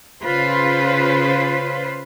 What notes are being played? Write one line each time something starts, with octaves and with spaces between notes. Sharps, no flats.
C#3 F4 B4 C5